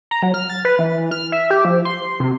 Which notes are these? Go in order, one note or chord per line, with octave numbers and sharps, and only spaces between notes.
A#5
F#3
F6
A6
B4
E3
F6
E5
G4
F3
C6
C3